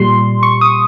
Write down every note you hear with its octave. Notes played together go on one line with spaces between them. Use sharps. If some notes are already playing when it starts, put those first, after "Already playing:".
Already playing: A#2 G3 C6
C#6
D#6